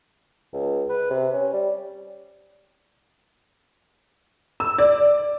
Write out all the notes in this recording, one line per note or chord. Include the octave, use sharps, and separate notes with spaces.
C#2
B4
C3
C#4
G3
E6
D5